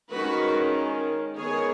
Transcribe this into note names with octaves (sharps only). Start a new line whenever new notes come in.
D#3 G#3 C#4 F#4 B4
D#3 G#3 B3 G#4 C#5